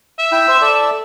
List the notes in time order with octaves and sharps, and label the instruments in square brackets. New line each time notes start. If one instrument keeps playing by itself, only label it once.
[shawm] E5
[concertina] E4 G5
C5 E6
A4 D5